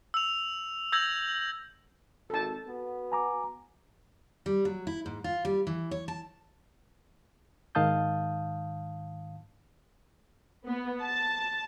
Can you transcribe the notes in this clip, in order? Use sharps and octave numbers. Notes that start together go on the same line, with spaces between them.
E6 F7
E6 G6 G#6 A#6 F#7
G#1 A4 A5
B3 F#4
G#5 A#5 D6
G3
F#3
E4
G#2
F4
G3
E3
C#5
A5
G#2 D#3 F5 A5 D#6 G6
B3
A5